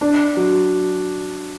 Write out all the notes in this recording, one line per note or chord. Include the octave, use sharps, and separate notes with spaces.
D4
F#3